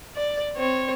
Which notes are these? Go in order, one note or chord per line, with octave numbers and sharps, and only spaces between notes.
D5
C4 C#5